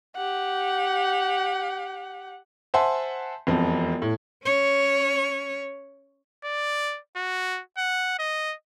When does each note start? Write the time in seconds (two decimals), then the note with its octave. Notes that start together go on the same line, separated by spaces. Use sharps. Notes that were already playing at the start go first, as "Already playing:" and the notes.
0.16 G4 F#5
2.74 C5 E5 F#5 G#5 A5 C6
3.47 E1 F2 C4
4.02 A2
4.44 C#4 C#5
6.44 D5
7.16 F#4
7.78 F#5
8.19 D#5